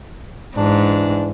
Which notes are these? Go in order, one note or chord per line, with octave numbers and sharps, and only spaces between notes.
G#2 E3 D4